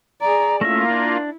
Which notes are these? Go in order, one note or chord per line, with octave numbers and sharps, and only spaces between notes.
G#4 D5 A#5
A3 A#3 C#4 E4 F4 E5 A#6
D4